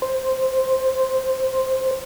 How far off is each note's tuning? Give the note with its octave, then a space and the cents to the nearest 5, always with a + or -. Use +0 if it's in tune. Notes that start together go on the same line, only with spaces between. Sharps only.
C5 +0